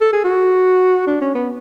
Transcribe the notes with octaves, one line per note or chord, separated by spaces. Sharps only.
A4
G#4
F#4
D4
C#4
B3